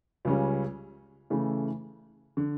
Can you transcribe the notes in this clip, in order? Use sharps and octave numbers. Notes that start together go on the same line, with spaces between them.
C#2 C#3 G3 C#4
C#3 E3 A3 E4
D3